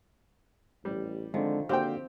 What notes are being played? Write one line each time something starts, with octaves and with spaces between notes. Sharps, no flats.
A1 G3
D3 D#3 F3 G#3 C4
D3 A#3 C4 F#4 G4 C5 F5 G5